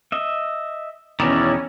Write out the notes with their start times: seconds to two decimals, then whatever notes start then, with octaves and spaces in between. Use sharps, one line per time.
0.12 D#5 E5
1.20 E2 B2 D#3 C#4 E4 D5